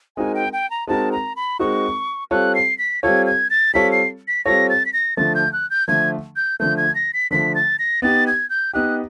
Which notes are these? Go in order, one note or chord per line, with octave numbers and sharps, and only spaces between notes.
G#3 C4 D#4 F#4 A#4 G#5
G5
G5
A#5
G#3 C4 D#4 F#4 A#4 A5
A#5
B5
G#3 C4 D#4 F#4 A#4 C#6
G3 C4 F4 A4 C#5 F#6
C7
B6
G3 C4 F4 A4 C#5 G#6
G#6
A6
G3 C4 F4 A4 C#5 B6
C7
B6
G3 C4 F4 A4 C#5 A#6
A6
B6
A#6
D3 F3 A3 A6
G6
F#6
G6
D3 F3 A3 G#6
G6
D3 F3 A3 G6
G#6
A#6
B6
D3 F3 A3 B6
A6
A#6
B3 D#4 G4 A6
G#6
G6
B3 D#4 G4 F#6